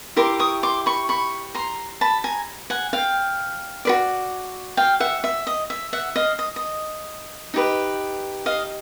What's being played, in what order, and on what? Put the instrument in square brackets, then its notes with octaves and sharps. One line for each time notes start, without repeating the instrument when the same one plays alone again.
[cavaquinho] E4 G4 A#4 C6 D6
C#6 D#6
C6 D6
B5 C#6
B5 C#6
A#5 C6
A5 B5
G#5 A#5
F#5 G#5
F5 G5
F#4 B4 D5
F5 G5
E5 F#5
E5
D#5
E5
E5 F#5
D#5 F5
D#5
D#5
D#4 G4 B4
D#5 F5